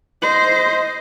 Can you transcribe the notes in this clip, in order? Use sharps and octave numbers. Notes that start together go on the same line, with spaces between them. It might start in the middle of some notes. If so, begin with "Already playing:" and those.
C5 D#5